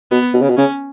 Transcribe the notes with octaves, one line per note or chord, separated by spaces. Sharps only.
B2 B3
B2
C#3
B2
C#3 C#4